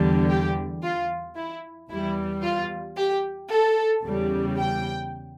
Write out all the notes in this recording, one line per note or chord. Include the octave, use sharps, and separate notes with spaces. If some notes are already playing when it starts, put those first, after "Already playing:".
Already playing: E2 D3 G3
G4
F4
E4
E2 E3 G3 E4
F4
G4
A4
E2 C#3 G3
G5